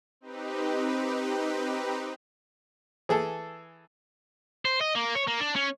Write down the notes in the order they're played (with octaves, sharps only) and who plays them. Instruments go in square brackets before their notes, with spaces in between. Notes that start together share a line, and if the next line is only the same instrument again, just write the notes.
[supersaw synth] C4 D#4 G4 B4
[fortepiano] E3 G#4 A4
[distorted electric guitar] C5
D#5
A#3
C#5
A#3
D4
C#4